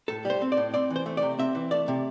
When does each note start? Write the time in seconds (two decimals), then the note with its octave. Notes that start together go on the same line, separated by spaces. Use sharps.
0.08 A2 A4
0.25 G3 C5
0.42 C4
0.52 D5
0.57 A2
0.74 C4 D5
0.90 E3
0.96 C5
1.06 A3
1.17 D5
1.22 C3
1.38 C4 E5
1.55 E3
1.71 A3 D5
1.88 C3